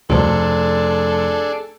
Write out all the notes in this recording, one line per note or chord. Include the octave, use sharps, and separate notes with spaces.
F1 D2 B2 D4 G#4 A4 C5